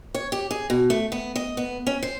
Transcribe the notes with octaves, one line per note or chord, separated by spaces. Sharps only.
C#5
G4
G#4
B2
A3
B3
D#5
B3
C#4
C5